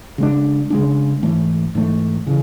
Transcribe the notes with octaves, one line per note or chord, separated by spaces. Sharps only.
C#3 G#3 D4
C#3 G#3 D4
G#2 E3 A3
G#2 E3 A3
C#3 E3